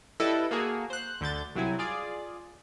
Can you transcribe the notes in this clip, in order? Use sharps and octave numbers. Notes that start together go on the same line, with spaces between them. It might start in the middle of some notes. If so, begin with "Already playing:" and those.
G3 E4 A4 B4 D#5
A#3 F#4 G#4 A4
C5 F#6
D2 D3 G6 A6
C2 F#3 C4 E4 G#5
F4 G#4 D5